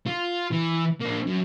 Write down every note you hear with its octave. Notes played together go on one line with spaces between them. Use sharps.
F4
E3
A#3 D4
F#2